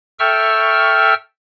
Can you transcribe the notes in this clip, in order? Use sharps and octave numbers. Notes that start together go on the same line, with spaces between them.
A4 E5 G5 C#6 E6 F6